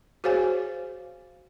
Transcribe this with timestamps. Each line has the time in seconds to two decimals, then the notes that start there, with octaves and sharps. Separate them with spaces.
0.24 F#4 G#4 C5 C#5 F5 G#5